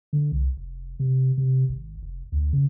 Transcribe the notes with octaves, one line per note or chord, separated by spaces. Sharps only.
D3
C2
F1
C3
C3
G#1
F1
D2
C#3